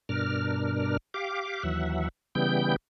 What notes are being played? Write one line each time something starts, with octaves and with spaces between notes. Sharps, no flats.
G2 B2 D4 A#4 F6
G4 F5 D6
D#2 E3 F#3 E5 F#5
C#3 E3 G3 B3 G5 G6